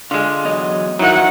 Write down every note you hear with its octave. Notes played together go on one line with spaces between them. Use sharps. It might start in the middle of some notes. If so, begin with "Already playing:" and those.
D3 G#3 F4
E2 F#3 D#5
D#3 F#3 D#4 E4 F#5